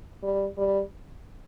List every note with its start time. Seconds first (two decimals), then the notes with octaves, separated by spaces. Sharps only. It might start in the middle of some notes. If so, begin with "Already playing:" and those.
0.23 G3
0.57 G3